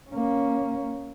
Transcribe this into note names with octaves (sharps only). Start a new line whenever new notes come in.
A#3 C#4